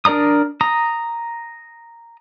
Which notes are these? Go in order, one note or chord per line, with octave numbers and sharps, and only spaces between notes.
D4 A#4 D5 A#5 D#6
A#5 D#6